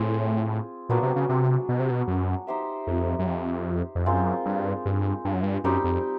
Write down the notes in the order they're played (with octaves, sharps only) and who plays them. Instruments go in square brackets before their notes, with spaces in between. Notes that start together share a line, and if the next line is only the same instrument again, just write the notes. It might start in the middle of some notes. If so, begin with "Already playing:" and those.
Already playing: [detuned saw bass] A2 [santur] C4 F4 G#4
[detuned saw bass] A#2 [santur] F#3 B3 D4
[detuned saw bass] C3
C#3
C3
B2
C3
B2
F#2
[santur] D#4 G4 C5 E5
[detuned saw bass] F2
F#2
F2
F2
[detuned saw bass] F#2 [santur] G#3 C4 F4 A#4
[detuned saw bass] G2
G2
G2
F#2
G2
[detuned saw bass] F#2 [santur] G3 C4 D#4 G4
[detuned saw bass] F2